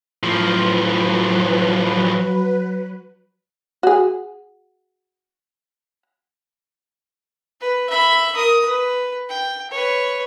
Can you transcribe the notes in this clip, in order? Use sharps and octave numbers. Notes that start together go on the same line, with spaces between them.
A2 F3 F#3 B4
F#4 G#4
B4
E5 B5
A#4 D#6
B4
G5
B4 C#5